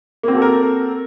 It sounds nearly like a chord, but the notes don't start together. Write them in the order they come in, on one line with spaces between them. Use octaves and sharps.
A#3 C4 F#4 A4 A#4